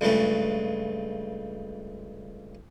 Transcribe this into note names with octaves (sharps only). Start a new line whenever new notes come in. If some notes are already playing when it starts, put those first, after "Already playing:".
C#2 G2 C#3 A3